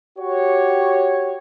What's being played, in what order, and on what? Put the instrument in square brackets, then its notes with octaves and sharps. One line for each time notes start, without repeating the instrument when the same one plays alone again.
[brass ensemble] F#4 G4 C#5